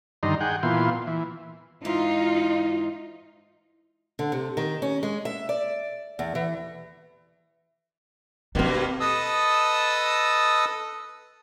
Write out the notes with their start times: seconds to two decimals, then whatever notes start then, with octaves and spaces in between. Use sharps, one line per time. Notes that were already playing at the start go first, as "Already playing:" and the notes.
0.23 G2 D3 D#3 D#4 A#5 C6
0.40 G#4 F#5 G5
0.63 A#2 E3 B3 F4 C6
1.07 E3
1.85 G#2 E3 D#4 F4
4.19 D3
4.32 C3
4.57 D#3
4.82 C#4
5.03 G#3
5.25 E5
5.49 D5
6.19 E2
6.35 E3
8.55 G2 B2 A#3 C4 D#4
9.00 A4 B4 D#5 A5 D#6 E6